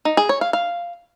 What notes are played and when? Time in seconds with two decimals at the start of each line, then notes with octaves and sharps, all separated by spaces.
0.05 D#4
0.17 G#4
0.29 C#5
0.41 F5
0.53 F5